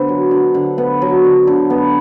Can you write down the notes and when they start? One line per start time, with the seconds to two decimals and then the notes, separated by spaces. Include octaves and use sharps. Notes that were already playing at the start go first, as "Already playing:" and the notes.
Already playing: D3 B3 C5
0.09 F#3
0.31 D3
0.55 D3
0.78 B3
1.02 F#3
1.24 D3
1.47 D3
1.70 B3